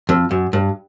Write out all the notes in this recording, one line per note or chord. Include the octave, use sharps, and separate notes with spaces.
F2
F#2
G2